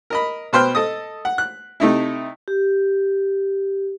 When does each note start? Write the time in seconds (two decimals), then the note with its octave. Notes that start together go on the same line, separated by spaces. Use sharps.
0.10 A#4 D#5 B5
0.53 B2 B4 C5 G5 C6 F6
0.75 A4 D#5 D#6
1.25 F#5
1.38 F#6
1.80 C3 A3 D#4 E4
2.48 G4